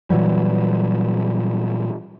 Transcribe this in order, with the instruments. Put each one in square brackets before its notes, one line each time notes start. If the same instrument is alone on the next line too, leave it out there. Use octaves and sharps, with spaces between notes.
[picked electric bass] A#2 E3 F#3 G3